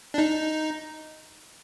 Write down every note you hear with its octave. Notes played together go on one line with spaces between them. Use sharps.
D4
D#4